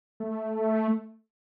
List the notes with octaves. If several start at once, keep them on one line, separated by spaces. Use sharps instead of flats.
A3